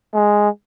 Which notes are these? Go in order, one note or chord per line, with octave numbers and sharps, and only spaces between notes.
G#3